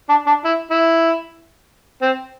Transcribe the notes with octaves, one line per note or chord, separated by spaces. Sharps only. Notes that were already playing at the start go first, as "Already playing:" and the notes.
D4
D4
E4
E4
C4